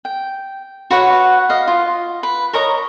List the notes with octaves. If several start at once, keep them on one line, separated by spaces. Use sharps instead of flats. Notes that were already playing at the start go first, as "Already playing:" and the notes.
G5
F#4 B4 C#5 F#5
D#5 F5
F4
B4
A#4 C#5 D#5 A#5